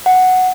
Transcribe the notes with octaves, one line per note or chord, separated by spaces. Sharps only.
F#5